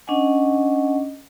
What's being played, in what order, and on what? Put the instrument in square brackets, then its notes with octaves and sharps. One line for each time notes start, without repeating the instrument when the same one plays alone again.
[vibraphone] C#4 D4 D#5 F#5 G#5